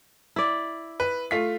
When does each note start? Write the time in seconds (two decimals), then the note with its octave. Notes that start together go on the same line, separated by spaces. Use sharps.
0.36 E4 D5
1.00 B4
1.31 A3 F4 B6